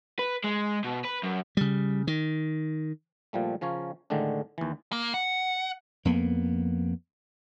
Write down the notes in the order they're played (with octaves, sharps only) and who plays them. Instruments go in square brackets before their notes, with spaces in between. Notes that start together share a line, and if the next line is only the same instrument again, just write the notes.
[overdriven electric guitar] B4
G#3
B2
B4
F#2
[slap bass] C#3 G3
D#3
[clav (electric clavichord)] A#2 F3 G3 A3
C#3 F3 C#4 A#4 C#5
A2 D3 D#3 G#3 A3 D4
D#2 E3
[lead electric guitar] A#3
F#5
[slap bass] F2 A#3 B3